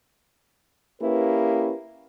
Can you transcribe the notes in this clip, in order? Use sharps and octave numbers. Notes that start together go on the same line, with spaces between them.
A#3 C#4 E4 G4 B4